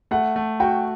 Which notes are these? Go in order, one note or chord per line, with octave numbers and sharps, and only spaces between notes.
A3 F#5
A3
F#4 G5